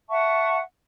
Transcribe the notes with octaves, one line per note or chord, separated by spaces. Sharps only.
E5 F#5 A5 C#6